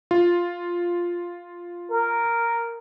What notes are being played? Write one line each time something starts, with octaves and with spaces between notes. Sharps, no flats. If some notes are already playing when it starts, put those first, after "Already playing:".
F4
A#4